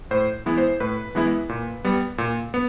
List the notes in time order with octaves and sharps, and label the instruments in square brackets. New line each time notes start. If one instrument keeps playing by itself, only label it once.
[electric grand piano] A2 C5
E3 G#3 B3 E4
C5
A2 B4
E3 G#3 B3 E4
A#2
G3 B3
A#2
B3